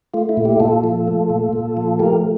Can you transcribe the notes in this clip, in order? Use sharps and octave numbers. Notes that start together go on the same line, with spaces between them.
A3 F4
E4
A#2
E4 G4
A#2 F4 A4
F3
A3
A#2
A#2
F3
A3 G4 A#4